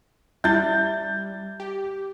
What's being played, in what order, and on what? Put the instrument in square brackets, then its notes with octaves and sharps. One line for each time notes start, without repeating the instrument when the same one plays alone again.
[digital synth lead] G3 [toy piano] E4 E5 [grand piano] G6 A6
[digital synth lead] G4